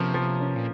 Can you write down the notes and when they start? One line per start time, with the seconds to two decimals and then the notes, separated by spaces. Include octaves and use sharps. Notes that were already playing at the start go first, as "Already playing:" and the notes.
Already playing: C3 F3 A#3 C#4
0.14 F3
0.40 C#4
0.56 A#2